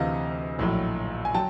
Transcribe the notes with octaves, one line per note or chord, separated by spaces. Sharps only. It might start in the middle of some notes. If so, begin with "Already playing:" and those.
Already playing: D2 C3 E3 D#5 F5
A#1 A2 F#3
G#5
F#3 G5 A5